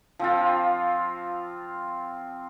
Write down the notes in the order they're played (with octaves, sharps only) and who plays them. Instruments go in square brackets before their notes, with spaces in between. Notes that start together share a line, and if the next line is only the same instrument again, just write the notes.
[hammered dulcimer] F3 C4 F4